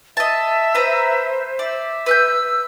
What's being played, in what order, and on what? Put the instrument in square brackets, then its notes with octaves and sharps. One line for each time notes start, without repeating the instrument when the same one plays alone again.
[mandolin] D#5 A5 [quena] E5
[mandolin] B4 A#5 [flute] C5
[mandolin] D5 [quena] E5
[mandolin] B4 F#6 G6 [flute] E6